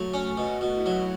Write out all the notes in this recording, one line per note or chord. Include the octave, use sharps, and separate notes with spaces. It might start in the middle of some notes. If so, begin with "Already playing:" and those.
Already playing: F#3 A3
C#4
B2 F#4
B2
E4
F#3